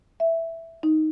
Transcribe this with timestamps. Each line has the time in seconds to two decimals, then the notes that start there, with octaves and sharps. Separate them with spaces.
0.20 E5
0.83 D#4